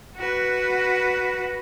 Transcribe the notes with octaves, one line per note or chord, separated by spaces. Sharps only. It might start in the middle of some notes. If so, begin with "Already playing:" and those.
F#4 B4